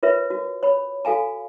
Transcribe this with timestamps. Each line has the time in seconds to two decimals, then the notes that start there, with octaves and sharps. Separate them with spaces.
0.03 F4 A#4 B4 C#5 E5
0.30 F#4
0.63 C#5 B5
1.05 F#4 A4 F5 G#5 A#5